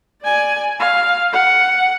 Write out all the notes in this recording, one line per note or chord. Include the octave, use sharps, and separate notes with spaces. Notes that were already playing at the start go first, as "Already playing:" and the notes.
D5 G#5
F5
F#5